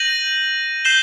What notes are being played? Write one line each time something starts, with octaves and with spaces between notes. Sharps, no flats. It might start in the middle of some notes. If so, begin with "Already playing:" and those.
Already playing: G6 A#6 D#7 F#7
G6 C7 E7 G7